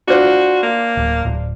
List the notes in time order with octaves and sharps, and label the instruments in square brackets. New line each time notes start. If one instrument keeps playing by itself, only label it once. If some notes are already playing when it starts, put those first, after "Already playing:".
[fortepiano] D4 F4 C5 [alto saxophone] F#4
[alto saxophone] A#3
[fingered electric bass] D1
D1